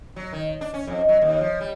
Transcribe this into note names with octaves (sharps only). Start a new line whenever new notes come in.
F#3
D#3
D4
C#4
F2
F#3
D#2
F3
G3